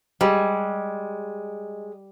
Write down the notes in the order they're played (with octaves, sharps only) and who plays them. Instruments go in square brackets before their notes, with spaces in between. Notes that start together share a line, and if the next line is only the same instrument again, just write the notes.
[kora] G3 [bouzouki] G#3